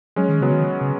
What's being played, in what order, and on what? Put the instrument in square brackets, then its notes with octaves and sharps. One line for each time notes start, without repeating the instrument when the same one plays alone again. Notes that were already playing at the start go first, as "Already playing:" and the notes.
[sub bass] F#3 [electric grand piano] G#3 C#4
[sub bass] D#3
[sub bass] C#3 [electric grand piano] F#3 B3
[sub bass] D#3
C#3